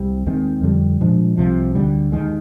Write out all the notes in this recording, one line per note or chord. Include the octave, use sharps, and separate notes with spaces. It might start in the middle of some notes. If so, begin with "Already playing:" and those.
Already playing: C2 C3 G3
D#2 D#3 G#3 C4
F2 D3 G3
A#2 F3 G#3 D4
C2 C3 F3
D2 D3 G3
D#2 D#3 G#3